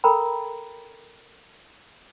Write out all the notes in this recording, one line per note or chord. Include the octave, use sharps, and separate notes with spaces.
A4 A#4 G5 A#5 B5